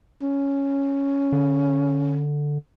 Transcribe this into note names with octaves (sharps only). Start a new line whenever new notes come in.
C#4
D3